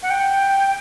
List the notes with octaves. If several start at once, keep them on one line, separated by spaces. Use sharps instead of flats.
F#5
G5